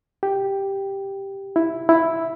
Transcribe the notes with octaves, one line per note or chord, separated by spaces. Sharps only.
G4
E4
E4